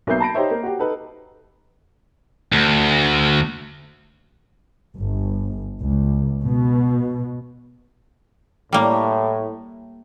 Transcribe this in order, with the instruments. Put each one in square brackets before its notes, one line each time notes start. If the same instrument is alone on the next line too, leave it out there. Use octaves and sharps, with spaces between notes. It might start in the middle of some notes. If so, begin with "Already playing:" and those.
[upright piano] B1 A#3 B3 E5 G6 C7
A5 B5 A#6 C7 D7
D#4 G4 C5 C#5 E5
A#3
F#4 G4
D#4 A4 B4
[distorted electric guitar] D2
[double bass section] G1
C#2
B2
[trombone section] A2 [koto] G3 A#3